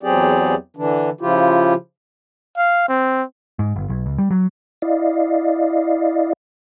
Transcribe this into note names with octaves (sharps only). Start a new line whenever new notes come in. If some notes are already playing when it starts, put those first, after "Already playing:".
E2 F#3 C4 G4 G#4 D5
D3 E3 D4
C#3 F3 E4 F4 G4
F5
C4
G#2
G1
B1
C#2
G3
F#3
E4 D5 D#5 F5